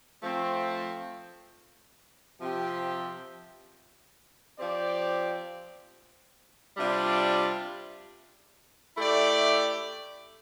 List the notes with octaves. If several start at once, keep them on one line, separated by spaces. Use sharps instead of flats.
F3 A3 C4
C3 F3 C4 G4
F3 C4 G4 D5
C3 G3 D4 F4
A3 E4 G4 D5